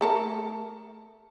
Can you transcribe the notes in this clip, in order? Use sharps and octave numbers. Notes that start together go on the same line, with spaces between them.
A3 A4 A#4